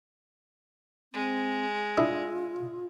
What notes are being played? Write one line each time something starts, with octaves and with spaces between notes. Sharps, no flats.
G#3 C4
D4 E4 F4 G#4